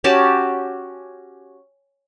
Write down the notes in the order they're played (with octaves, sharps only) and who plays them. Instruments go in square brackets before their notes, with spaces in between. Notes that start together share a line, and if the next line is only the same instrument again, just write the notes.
[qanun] C#4 F#4 G4 A5